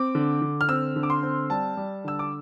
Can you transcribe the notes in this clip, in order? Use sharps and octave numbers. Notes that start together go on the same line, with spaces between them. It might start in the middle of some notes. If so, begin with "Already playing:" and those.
Already playing: C4 D6
D3
D3
F6
C4 E6
D3
D6
C6
C4
G3 A5
G3
D3 E6
D6